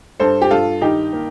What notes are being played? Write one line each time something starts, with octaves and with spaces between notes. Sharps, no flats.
G2 A4 C5
G4
G2 F4 A4
D#3 D#4 G4
A#3